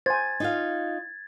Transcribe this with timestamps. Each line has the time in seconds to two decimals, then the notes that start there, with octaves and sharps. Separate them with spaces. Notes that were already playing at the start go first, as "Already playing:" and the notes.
0.06 C5 G#5 G#6 A6
0.40 D#4 F4 F5